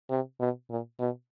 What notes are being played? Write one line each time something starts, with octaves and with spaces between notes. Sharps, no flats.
C3
B2
A#2
B2